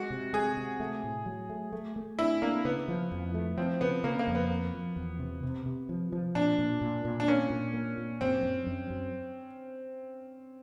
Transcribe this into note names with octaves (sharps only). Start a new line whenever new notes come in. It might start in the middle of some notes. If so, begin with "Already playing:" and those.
Already playing: G#3 F#4
C3
G#3 G#4
C3
A3
A2
F#3
A3
A3
A3
D4 E4
A#3 D4
C#3 B3
F3
F2
A3
F3 C4
C#3 B3
C#3 A#3
A#3
F2
B3
A#3
F3
E2
C3
C3
C3
F3
F3
A#2 D4
A#2
A#2
A#2
D4
A#3 C#4
A#2
A#3
A#2
F#2 C4
F#2
F#2
F#2